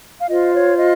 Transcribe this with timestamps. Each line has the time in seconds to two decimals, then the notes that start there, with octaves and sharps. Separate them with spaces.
0.20 F5
0.28 F4 C5 D#5
0.54 C#5
0.79 D#5